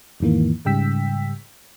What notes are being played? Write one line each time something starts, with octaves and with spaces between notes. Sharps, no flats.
E2 G#2 D#3 E3 A#3
G#2 C#3 G3 G5 E6 B6